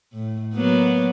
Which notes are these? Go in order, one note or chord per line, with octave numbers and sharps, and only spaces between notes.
A2
F#3 A#3 B3